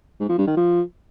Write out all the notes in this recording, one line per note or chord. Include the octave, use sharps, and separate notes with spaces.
G#2
F3
G2
D#3
F3